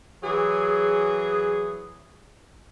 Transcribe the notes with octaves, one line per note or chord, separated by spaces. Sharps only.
E3 F#3 G#4